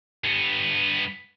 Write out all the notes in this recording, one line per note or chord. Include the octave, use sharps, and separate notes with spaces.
G2 B3